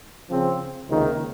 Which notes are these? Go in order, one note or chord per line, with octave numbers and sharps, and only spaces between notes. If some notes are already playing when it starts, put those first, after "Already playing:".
C#3 F3 C4
C#2 C3 D#3 A#3 D#4